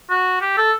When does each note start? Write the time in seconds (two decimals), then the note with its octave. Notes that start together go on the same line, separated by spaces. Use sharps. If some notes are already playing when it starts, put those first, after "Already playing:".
0.10 F#4
0.41 G4
0.57 A4